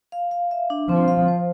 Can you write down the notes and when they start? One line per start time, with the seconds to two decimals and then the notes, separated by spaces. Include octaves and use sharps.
0.12 F5
0.31 F5
0.51 E5
0.70 D4
0.89 F3 C4
1.08 F5
1.28 C5